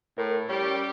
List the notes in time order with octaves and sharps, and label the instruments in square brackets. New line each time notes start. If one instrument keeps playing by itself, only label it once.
[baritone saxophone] A2 [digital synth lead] A#4
[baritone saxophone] G3 [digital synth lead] C#4 [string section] G4